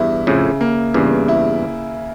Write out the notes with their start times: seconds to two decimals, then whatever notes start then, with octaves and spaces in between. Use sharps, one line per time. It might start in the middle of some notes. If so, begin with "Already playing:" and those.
Already playing: E2 G2 E4
0.27 F2 A2 C#3
0.61 A#3
0.94 E2 G2 C#3
1.28 E4